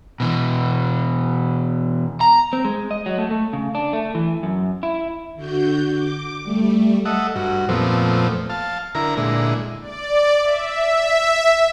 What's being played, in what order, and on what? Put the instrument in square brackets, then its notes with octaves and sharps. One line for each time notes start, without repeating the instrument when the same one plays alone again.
[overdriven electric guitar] B2 E3
A#5
[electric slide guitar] C4
G#3
D#5
F#3
A3
A3
C#3
D4
A3
E3
F#2
E4
[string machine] D3 F#4 G6
D6
G3 A3
[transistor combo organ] A4 D#5 E5 F#5
G2 F#4
F2 A#2 F3 A3 B3 C4
F5 A5
D3 E4 A#4 A#5
A#2 D3 G#3 E4
[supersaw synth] D5
E5